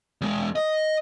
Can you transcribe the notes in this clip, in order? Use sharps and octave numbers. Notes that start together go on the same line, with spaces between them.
E2 G#3
D#5